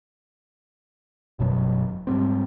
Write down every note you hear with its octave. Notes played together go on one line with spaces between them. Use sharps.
G1 F#2 B2 F#3
G#2 G3 C4